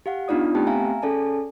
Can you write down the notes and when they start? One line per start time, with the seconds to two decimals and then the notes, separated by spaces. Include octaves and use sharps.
0.06 G4 F5 F#5
0.28 B3 D4 D#4 F4 D5 D#6
0.55 A3 B3 C4 G4 G5 A5
0.67 E5 F5 G#5 A#5
1.02 C#4 G#4 A4 D5 G#5 A5